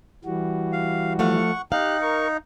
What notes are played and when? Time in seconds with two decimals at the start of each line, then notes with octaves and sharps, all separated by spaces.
0.25 E3 G3 F#4
0.73 F5
1.19 F3 A3 F5 F#5 C#6
1.72 D#4 G4 F5 F#6
2.01 A#4 C#6